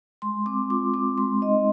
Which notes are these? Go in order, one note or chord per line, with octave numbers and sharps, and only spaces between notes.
G#3 C6
C4 D6
F4 D6
C4 D6
G#3 C6
D#4 D#5